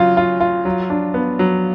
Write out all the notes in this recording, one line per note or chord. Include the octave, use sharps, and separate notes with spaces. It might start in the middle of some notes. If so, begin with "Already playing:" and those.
Already playing: C#3 F#3 F4
F4
F4
F#3
D4
B3
F#3